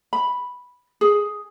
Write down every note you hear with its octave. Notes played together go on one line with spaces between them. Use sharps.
B5
G#4